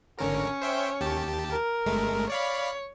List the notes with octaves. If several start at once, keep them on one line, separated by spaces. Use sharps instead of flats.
G#1 D3 C#4 A#4 C#5
C5 E5 G5
D#2 G4 A5
A#4
G1 G#3 A3
C#5 D5 F5 B5